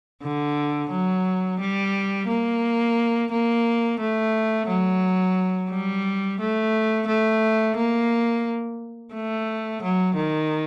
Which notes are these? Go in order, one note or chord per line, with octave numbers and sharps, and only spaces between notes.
D3
F#3
G3
A#3
A#3
A3
F#3
G3
A3
A3
A#3
A3
F#3
D#3